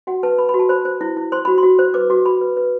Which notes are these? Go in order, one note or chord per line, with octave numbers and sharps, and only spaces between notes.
F#4 F#5
B4 A5
B4 B5
B5
F#4
A5
C5 B5
C5
E4
E4
C5 C6
F#4 B5
C6
F#4
C5
B4 D6
F#4 D6
F#4 B5
B4
B4